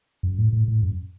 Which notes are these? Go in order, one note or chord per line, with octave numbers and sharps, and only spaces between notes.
F#2
A2
A2
A2
F#2